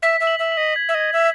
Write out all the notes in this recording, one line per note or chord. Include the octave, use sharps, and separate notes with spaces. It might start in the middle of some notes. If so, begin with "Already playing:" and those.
E5 B6
E5
F#7
E5
F#7
D#5
G#6
E5
D#5
G#6
E5